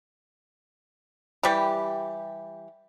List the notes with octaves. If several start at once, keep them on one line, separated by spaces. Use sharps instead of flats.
E3 G3 G4